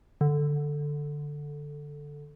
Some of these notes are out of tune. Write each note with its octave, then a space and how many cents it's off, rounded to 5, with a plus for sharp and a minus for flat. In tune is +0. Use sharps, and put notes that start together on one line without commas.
D3 +0